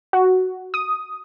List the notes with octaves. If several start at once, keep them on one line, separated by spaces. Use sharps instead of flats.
F#4
D#6